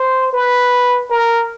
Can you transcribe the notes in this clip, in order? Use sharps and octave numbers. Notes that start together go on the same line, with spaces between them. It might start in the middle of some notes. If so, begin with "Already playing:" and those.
Already playing: C5
B4
A#4